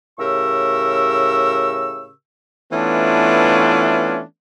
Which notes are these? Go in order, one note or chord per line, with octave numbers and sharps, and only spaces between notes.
A2 C#3 G4 A#4 C#6 E6
E3 A3 B3 C#4 D4 F4